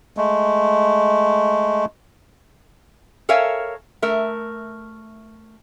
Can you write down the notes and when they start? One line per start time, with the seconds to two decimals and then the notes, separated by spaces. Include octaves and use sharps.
0.17 G#3 A3
3.29 A4 A#4 C#5 E5 F5 G#5
4.02 A3 A#4 E5